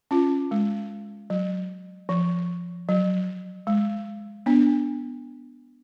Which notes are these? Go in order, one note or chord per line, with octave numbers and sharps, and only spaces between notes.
C#4 F4
G#3
F#3
F3
F#3
G#3
B3 D4